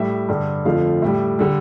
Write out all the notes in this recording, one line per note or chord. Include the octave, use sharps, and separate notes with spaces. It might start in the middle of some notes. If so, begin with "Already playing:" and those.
Already playing: A2 G3 E5
G2 D3 G3
F2 D3 F3 A3 F5
A2 G3 E5
D3 G3